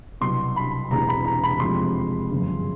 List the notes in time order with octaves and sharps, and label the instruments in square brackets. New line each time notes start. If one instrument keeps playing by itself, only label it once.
[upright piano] C2 B2 F#3 C6
B5
E1 E2 C3 A#5
B5
A#5
B5
F2 C3 F3 G#3 C6
G1 F#2 C#3 F3